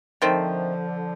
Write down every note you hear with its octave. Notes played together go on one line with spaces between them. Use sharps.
D3 D#3 F3 A3 C4